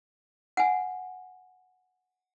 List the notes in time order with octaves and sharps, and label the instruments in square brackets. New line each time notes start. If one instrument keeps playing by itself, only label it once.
[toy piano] F#5 G#5